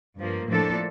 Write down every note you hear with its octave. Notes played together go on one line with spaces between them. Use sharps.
G2 F3 A#3
A2 F3 A#3 D4 A4